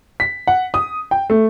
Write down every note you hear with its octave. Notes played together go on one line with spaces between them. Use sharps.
B6
F#5
D#6
G5
A3